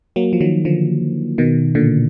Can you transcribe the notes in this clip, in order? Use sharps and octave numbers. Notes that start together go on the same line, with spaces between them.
F#3 A#3
F3
D#3 F#3
D3 F3
B2 D#3
A#2 D3